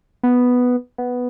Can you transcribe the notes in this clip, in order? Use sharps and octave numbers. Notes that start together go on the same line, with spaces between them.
B3
B3